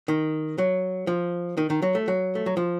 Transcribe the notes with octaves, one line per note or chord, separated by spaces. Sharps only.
D#3
F#3
F3
D#3
D#3
F#3
A3
F#3
A3
F#3
F3